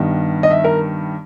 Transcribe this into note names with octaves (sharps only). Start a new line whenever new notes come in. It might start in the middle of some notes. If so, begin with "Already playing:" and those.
Already playing: G2 D#3 G3 B3
D#5
E5
A#4